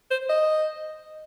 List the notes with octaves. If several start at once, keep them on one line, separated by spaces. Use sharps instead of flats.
C5
D#5